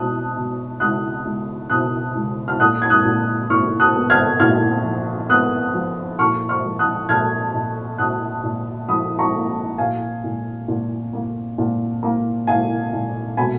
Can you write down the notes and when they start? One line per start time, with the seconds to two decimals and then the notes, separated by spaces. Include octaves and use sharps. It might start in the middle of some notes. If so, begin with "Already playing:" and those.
Already playing: B2 D#6 F#6
0.36 B2
0.80 C#2 D#6 F#6
1.25 C#2
1.70 B2 D#6 F#6
2.15 C#2
2.48 F6
2.60 A#2 D#6 F#6
2.82 G#6
2.90 D#6 F#6
3.05 A#2
3.50 A#2 C#6 F6
3.80 D#6 F#6
3.95 B3
4.10 F6 G#6
4.40 A#2 F6 G#6
4.84 F3
5.29 B3 D#6 F#6
5.74 F3
6.19 A#2 C#6 F6
6.49 C#6 F6
6.64 F3
6.79 D#6 F#6
7.09 A#2 F6 G#6
7.54 A#2
7.98 A#2 D#6 F#6
8.43 A#2
8.88 F3 B5 D#6
9.19 A#5 C#6
9.34 A#3
9.78 A#2 F5 G#5
10.24 A#2
10.68 A#2
11.13 A#3
11.58 A#2
12.03 A#3
12.47 A#2 F5 G#5
12.93 A#2
13.37 B2 G#5 B5